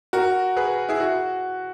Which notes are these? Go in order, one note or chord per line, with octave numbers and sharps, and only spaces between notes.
F#4 A#4
G#4 B4
E4 G#4
F#4